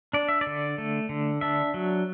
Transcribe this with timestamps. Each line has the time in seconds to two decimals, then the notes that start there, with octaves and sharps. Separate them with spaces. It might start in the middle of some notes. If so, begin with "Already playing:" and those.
0.13 D4 D5
0.29 E5
0.41 D5
0.47 D3
0.78 A3
1.09 D3
1.41 D4 E5
1.74 F#3